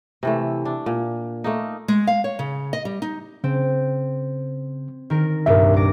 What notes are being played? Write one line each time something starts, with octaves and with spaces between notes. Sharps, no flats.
C3 E3 A3
D4
A#2
A3 A#3 D#4
G#3
F5
C#5
C#3
D#5
G3
D#4
C#3 C4
D#3 A#4
C2 G2 A#2 A#4 E5
D6 A#6